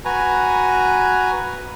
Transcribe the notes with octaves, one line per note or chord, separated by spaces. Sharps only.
F#4 B4 G#5 A#5